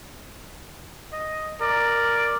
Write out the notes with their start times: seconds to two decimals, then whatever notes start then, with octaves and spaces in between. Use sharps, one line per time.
1.13 D#5
1.61 A#4 D5